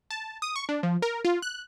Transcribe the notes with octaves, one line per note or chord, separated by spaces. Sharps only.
A5
D#6
C#6
D4
F3
A#4
F4
F#6